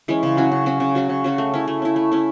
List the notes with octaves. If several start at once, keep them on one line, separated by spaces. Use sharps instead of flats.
E3 G#3 C#4
C#3
F#3 C#4 F#4
C#3
F#3 C#4 F#4
C#3
F#3 C#4 F#4
C#3
F#3 C#4 F#4
A3
C#4 E4
A3
C#4 E4
A3
C#4 E4